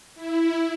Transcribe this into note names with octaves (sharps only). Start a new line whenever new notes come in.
E4